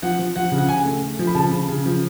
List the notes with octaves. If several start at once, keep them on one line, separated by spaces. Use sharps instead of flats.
F3 F#5
F3
F3 F#5
C#3
F#5
C#3 G#5
A3
A3
F3
B5
C#3 A5
C#3
C#3
F3